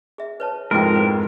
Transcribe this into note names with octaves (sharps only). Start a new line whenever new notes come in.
G#4 E5
B4 C#5 A5
F2 G#2 G#3 E4 A#4 G5
B4 C5